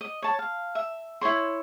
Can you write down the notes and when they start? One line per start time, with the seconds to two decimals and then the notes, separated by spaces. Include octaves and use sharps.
0.01 D#5
0.22 C#5 A5
0.39 F5
0.75 E5
1.21 E4 A4 C#5 C6